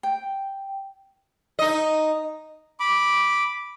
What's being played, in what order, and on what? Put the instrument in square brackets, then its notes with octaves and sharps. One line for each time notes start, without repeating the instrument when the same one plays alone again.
[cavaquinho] G5
[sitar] D#4 D#5
[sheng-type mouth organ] B5 D6